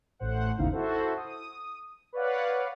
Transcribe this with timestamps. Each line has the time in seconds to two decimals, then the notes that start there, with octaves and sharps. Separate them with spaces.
0.19 A1 A2 C5 F#5
0.58 G#1 D#2 C#3 D#4 E4 F5
0.72 E4 F#4 A4 C5
1.17 D#6
2.13 B4 C#5 D5 F5 F#5